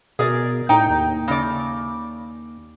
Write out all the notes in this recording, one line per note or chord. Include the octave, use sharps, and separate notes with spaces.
B2 G#4 A#4 D5
A2 D#4 G5
D#2
C#3 D5